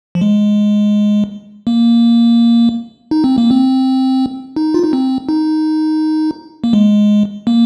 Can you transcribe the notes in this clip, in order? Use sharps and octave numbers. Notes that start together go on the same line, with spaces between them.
F3
G#3
A#3
D#4
C4
A#3
C4
D#4
F4
D#4
C4
D#4
A#3
G#3
A#3